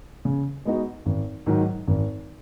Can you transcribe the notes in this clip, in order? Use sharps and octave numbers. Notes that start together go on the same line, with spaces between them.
C#3
G#3 B3 D#4 F#4
G#1
G#2 D#3 F#3
G#1